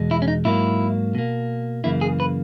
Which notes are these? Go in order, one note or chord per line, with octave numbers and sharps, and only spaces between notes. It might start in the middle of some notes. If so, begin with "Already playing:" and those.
Already playing: E2 B2 G#3
E4
C#4
D#4
G#2 F#3 A#3 E4
B2 A#3
F#2 C#3 E3 A#3 E4
G#4
B4